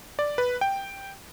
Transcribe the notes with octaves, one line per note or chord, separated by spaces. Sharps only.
D5
B4
G5